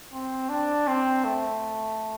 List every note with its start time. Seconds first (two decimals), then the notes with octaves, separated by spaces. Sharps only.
0.13 C4
0.49 D4
0.87 C4
1.24 A3